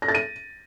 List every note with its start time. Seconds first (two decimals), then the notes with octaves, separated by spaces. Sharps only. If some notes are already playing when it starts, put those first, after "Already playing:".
0.02 A#6
0.08 A6
0.15 D#7